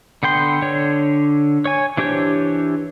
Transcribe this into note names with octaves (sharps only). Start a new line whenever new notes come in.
D3 B3 G5 C6
D3 D4 C#5
C#5 G#5
E3 D4 G4 C5 C#5